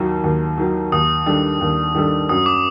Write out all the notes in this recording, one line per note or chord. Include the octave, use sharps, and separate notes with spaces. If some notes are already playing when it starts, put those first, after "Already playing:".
Already playing: D#2 D#3 F#3
D#2
D#3 F#3
D#2 D#6
D#3 G3 D4 A4
D#2
D#3 G3 D4 A4
F#2 D#6
D6